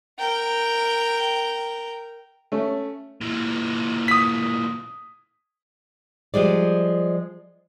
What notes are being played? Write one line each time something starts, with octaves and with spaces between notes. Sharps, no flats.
A#4 G5
A3 C#4
A#2 E3
D#6 B6
F3 G3 G#3 D5